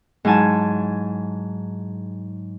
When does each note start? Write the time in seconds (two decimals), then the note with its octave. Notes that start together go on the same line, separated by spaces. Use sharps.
0.25 G#2 F#3 E4 G#5 A5